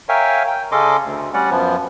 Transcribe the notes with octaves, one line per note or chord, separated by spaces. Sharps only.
A#4 C#5 E5 F5 G5 G#5
G5
C#3 C#4 A4 D#5 C6 D6
D2
G3 C#4 D5 F#5
F#2 F3 B3